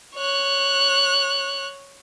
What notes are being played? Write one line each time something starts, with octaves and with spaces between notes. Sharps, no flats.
C#5 F#6